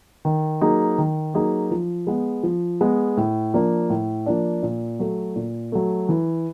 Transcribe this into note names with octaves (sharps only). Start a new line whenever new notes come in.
D#3
F#3 A#3 D#4 G#4
D#3
F#3 A#3 D#4 G#4
F3
G#3 B3
F3
G#3 B3
A2
F3 A#3 D4
A2
F3 A#3 D4
A#2
F#3 A3
A#2
F#3 A3
E3